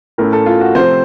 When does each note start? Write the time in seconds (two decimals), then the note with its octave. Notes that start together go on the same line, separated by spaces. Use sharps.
0.18 A2 A3 C#4 A#4
0.33 A4
0.46 F4
0.60 F#4
0.75 C3 F3 A3 C4 C5